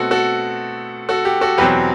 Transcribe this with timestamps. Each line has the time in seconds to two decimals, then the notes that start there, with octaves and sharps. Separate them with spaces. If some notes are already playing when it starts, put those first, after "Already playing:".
Already playing: B2 A3 C4 F#4 A4
0.11 F#4 A4
1.09 F#4 A4
1.25 G4
1.41 F#4 A4
1.58 E2 B2 F#3 C4 G4 B4